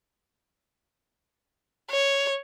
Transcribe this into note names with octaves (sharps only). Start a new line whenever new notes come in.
C#5